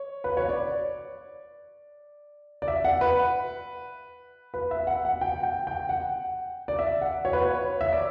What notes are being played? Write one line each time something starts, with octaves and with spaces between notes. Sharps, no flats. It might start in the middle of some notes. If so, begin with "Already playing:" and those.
Already playing: C#5
B4
C#5
D5
D5
E5
F#5
B4
B4
E5
F#5
F#5
G5
G5
G5
F#5
D5
E5
F#5
C#5
B4
C#5
E5
D5